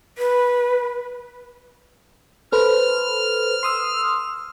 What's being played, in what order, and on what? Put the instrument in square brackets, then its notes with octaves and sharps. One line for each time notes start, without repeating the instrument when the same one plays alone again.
[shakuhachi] B4
[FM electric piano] A4 B4 C5 [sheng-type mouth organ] F6
[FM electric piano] C6 D#6 E6